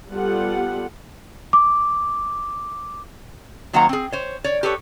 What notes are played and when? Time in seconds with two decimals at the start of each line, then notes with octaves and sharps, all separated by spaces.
0.11 G3 B3 F4 G4 A4 F#5
1.53 D6
3.73 D#3 F#3 A#3 C5 F#5 A#5
3.89 C4 G#4
4.12 C5 C#5
4.44 C#5 D5
4.63 G4 A4 B4 C#5